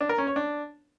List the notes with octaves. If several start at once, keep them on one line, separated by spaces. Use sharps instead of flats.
D4
A#4
C#4
C#5
D4